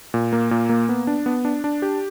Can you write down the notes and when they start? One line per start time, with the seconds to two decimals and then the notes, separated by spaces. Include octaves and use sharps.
0.14 A#2
0.33 A#3
0.51 A#2
0.69 A#3
0.89 B3
1.07 D4
1.26 B3
1.45 D4
1.64 D4
1.82 G4